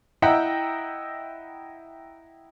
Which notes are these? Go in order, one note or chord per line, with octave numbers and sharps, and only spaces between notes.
E4 D#5 E5 F#5 G5 A#5